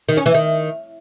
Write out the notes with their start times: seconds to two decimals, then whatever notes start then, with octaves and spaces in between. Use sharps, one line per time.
0.09 D#3
0.17 C#4
0.26 E3
0.34 D#3